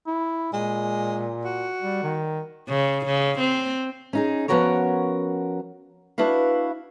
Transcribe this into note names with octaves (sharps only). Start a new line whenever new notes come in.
E4
A#2 G#3
F#4
G3
D#3
C#3
C#3
C4
C#4 D#4 G#4
F3 B3 C#4 F#4 A#4 C#5
D4 E4 F#4 B4 F5